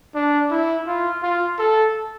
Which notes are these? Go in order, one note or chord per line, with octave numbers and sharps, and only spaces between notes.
D4
E4
F4
F4
A4